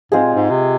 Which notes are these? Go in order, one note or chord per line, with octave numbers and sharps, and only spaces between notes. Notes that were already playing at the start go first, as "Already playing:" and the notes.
G#2 G#3 C4 F4 G#4
A#2
G#2
C3